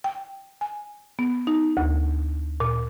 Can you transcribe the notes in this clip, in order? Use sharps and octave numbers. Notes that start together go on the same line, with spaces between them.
G5
G#5
B3
D#4
D2
A#2